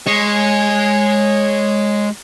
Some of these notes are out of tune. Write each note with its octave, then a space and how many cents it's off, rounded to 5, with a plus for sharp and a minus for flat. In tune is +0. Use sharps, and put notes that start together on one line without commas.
G#3 +0 C#5 -15